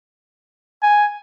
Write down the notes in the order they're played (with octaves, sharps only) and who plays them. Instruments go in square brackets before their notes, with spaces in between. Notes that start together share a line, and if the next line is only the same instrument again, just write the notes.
[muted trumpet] G#5